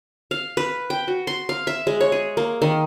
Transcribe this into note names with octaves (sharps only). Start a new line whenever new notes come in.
F5
B4
G5
F#4
C6
F5
E5
G#3
C#5
G#4
A#3
D#3